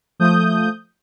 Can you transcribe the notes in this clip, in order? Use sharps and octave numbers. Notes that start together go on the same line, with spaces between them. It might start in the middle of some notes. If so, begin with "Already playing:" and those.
F3 A3 D#6 G6